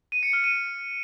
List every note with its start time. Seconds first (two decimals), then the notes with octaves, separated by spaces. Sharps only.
0.12 D#7
0.23 C#7
0.33 F6
0.44 D#7